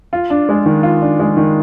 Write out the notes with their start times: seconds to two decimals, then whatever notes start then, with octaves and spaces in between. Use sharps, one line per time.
0.13 F4
0.30 D4
0.49 G#3
0.66 D#3
0.83 F4
1.02 D4
1.19 G#3
1.37 D#3